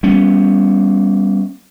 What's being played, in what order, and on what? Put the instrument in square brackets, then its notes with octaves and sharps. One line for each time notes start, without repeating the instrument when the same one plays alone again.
[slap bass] G3 B3 C#4